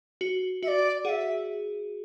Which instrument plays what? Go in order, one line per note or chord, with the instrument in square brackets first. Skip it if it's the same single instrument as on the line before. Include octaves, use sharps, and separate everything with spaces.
[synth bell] F#4
[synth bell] F#4 [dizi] E5
[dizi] D5
[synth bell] G#4 [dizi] F#5
[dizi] E5